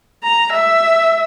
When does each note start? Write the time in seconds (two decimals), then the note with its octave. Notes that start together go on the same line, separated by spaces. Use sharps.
0.23 A#5
0.53 E5